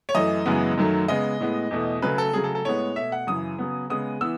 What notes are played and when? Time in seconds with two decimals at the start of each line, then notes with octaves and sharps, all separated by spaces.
0.09 C#5
0.15 F#2 E3 A3 D#5
0.46 F#2 C#3 E3 G#3 B3
0.78 F#2 D#3 F#3 A3
1.08 C#3 G#3 B3 D#5
1.40 A2 G#3 B3
1.71 E2 B2 A3
2.02 C#3 F#3 A3 B4
2.18 A4
2.33 C#3 F#3 A3 G#4
2.44 A4
2.55 A4
2.65 A2 G#3 B3 C#5
2.96 B2 A3 E5
3.12 F#5
3.27 F#2 C#3 E3 D#6
3.59 C#3 F#3 B3
3.90 C#3 G#3 B3 D#6
4.21 E3 B3 E6